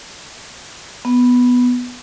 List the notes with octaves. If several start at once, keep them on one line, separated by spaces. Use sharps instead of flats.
B3